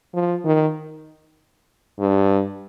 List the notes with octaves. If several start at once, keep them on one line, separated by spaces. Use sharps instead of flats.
F3
D#3
G2